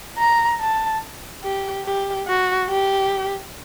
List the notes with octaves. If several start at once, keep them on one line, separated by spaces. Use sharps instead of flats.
A#5
A5
G4
G4
F#4
G4